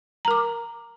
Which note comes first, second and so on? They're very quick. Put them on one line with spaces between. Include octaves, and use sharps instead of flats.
A#5 A#4 D6